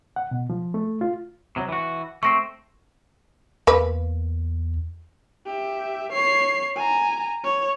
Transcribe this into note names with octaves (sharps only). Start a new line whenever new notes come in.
F#5
B2
F3
A3
F4
C3 F#3
E3 F#4
A3 C4 C#6 A#6 C7
E2 A#3 B4
G4 E5
C#5 C7
G#5 A#5
C#5